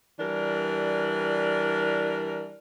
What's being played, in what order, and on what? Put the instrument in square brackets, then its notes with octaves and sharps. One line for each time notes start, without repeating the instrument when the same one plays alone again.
[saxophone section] E3 G3 D4 A#4